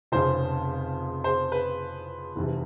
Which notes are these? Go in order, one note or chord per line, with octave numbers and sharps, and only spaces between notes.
F1 F2 C#3 C5
C5
B4
F1 E2 C3